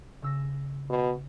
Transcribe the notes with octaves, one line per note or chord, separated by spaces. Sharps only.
C#3 E6 A#6
B2